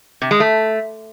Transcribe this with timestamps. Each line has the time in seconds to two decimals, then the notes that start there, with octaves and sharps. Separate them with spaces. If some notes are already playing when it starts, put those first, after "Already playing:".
0.22 C3
0.31 G#3
0.40 A3